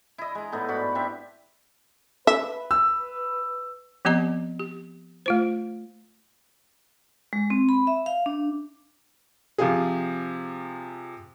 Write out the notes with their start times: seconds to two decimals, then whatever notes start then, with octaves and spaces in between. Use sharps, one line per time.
0.18 E4 D#5
0.35 G#3 A#5
0.52 A2 B3 D#4 A4
0.68 G#2 F#4 D5 B5
0.95 C4 D4 G4 E5
2.27 B4 E5
2.71 E6
4.05 F3 B3 C4 G4 D#5 A#5
4.59 G4
5.26 A3 F4 C5
7.33 G#3
7.50 C4
7.69 B5
7.87 E5
8.06 F5
8.26 D4
9.58 C3 F3 F4 G4 G#4